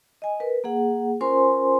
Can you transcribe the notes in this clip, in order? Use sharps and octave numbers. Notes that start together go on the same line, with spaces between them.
D#5 G#5
A#4 B4
A#3 G#4 F#5
C#4 F4 A#4 C5 G#5 C6